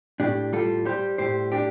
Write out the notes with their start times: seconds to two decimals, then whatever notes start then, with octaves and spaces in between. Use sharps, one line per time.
0.20 A2 D4 G4
0.53 G3 F4 A4
0.85 G3 G4 C5
1.18 A2 G4 C5
1.52 D4 G4